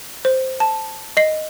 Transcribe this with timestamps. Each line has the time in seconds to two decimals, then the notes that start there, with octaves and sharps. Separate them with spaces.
0.25 C5
0.60 A5
1.17 D#5 C7